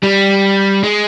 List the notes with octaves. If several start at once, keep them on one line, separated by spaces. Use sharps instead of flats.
G3
G#3